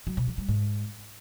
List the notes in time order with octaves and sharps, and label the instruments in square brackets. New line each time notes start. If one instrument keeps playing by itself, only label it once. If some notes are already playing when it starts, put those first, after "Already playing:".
[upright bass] F#3
B2
F3
G3
G#2